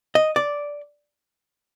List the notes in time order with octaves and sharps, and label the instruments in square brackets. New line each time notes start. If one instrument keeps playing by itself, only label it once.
[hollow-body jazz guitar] D#5
D5